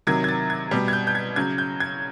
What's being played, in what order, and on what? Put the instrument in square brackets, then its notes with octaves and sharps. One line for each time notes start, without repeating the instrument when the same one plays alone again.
[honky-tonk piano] C3 D#3 F#3 G#6
G#6
A6
G#6
B2 G3
G#6
G6
G6
G#6
C#3 F#3 G#6
G6
G#6